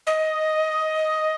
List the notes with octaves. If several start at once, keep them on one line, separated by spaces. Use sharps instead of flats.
D#5